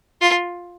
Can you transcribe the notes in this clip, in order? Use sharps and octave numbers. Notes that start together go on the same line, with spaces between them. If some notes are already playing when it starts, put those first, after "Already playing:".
F4